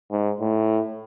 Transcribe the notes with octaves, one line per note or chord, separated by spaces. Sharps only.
G#2
A2